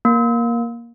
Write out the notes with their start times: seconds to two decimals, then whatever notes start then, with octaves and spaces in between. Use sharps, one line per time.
0.05 A#3